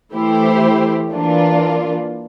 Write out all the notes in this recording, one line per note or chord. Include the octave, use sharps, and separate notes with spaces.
E3 A3 E4 G4 C5
E3 A#3 D4 F4